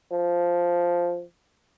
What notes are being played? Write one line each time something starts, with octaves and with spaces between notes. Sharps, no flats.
F3